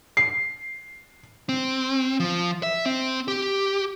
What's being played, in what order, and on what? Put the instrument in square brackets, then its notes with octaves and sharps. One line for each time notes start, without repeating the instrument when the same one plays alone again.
[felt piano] C7
[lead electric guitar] C4
F3
E5
C4
G4